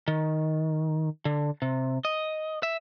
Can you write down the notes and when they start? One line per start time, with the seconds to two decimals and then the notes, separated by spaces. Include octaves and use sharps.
0.08 D#3
1.25 D3
1.62 C3
2.05 D#5
2.63 E5